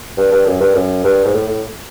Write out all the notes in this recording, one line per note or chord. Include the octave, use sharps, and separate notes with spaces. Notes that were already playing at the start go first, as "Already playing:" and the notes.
G2
G2
F#2
G2
F#2
G2
G#2
A2
A2